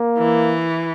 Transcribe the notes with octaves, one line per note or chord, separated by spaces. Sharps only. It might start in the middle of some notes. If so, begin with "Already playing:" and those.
Already playing: A#3
E3